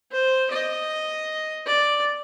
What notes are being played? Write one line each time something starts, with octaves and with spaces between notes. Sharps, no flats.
C5
D#5
D5